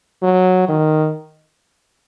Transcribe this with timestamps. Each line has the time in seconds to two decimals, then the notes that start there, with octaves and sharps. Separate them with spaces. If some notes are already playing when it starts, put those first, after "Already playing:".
0.22 F#3
0.68 D#3